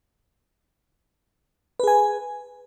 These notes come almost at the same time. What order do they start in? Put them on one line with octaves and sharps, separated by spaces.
B4 G#4 G#5